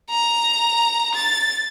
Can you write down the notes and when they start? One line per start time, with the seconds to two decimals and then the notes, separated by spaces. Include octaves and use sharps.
0.10 A#5
1.15 A6